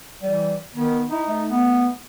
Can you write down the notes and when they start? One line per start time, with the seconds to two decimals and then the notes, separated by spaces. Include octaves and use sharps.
0.22 E3 G3
0.75 D#3 B3
1.10 D#4 E4
1.28 A3
1.50 B3